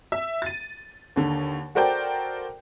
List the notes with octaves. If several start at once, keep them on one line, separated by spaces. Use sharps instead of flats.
E5
A6 D#7
D#2 D3
F#4 A4 A#4 C5 D5 G5